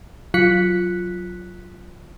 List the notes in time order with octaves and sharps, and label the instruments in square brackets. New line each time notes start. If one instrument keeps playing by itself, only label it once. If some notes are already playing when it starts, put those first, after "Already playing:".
[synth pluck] F#3 F4 F#6 B6 C#7